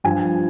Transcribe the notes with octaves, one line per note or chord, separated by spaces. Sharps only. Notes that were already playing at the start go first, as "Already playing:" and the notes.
G2 F3 G#5